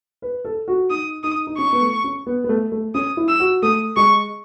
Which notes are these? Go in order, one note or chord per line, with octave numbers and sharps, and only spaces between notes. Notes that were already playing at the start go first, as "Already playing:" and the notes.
B4
A4
F#4
D#4 D#6
D#4 D#6
D#4
C#4 C#6
B3
A3
C#4
B3
B3
A3
A3
C#4 D#6
E4
E6
F#4
A3 D#6
G#3 C#6